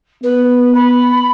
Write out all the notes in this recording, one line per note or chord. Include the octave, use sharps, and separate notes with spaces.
B3 B4
B5